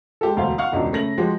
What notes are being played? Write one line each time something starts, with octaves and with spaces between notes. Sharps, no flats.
G#3 G4 A4
E1 D2 C5 F5
F5 F#5 C#6 F6
E1 C#2 D4
C#3 A3 A#6 F#7
F3 G#3 F#4 G4